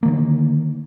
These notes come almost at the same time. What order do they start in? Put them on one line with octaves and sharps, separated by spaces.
A#3 D3 D#3